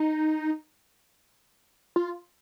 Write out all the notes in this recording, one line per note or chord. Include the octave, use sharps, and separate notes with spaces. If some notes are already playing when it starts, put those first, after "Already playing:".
Already playing: D#4
F4